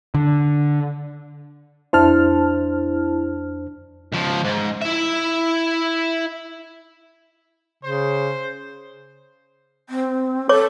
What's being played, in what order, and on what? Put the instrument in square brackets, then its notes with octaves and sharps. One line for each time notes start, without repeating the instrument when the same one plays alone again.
[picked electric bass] D3
[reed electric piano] F2 D4 C5 [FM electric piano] E4 A5 F6
[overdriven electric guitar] C#2 F3
G#2
E4 E5
[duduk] C#3 [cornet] C5
[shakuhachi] C4
[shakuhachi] A4 [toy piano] C#5 D6